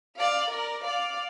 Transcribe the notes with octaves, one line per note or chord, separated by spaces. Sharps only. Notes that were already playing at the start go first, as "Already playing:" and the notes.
D5 F5
A#4 D5
D5 F5